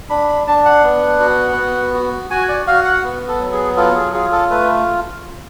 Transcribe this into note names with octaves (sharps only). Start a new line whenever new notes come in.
D4 B5
B5
D4 A5
F#5
B3
F#4
B3
F#4
F#4 G#5
D5
F#4 F5
F#5
B3
A4
F#3
G#4
F4 A4
G#4
F4 G#4
A4
A3 B4